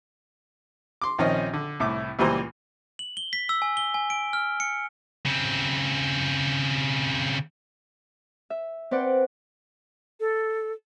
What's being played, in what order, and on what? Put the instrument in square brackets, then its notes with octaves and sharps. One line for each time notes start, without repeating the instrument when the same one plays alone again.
[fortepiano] C6 D6
A#1 D#3 F3 C4 C#4 D#5
D3
C2 A2 D6
C#2 A#2 E3 G3 C5 A#5
[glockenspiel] F#7
G7
B6
E6
G#5
G7
G#5
D7
F6
C#7
[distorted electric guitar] C#3 C4
[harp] E5
C4 B4 C5 D5 F#5 G5
[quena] A4